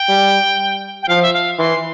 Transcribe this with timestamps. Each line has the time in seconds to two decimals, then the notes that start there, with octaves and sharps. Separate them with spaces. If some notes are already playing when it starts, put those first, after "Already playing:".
Already playing: G5
0.09 G3
1.03 G5
1.08 F3 F5
1.23 E5
1.33 F5
1.58 E3 C6